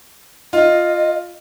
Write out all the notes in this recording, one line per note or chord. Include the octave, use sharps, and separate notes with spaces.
F4 D#5